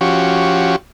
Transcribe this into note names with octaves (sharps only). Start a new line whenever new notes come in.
F3 C#4 F#4 G4